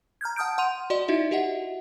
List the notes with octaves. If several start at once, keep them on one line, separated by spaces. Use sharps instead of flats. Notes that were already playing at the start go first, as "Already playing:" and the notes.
A#5 F6 G6 G#6
F#5 A5 D#6 F6 G6 D7
F#5 C6 D#7 F7
F#4 D5 D#5 C6
D#4 E4 F#4 E5
F#4 G4 D#5 E5 F#5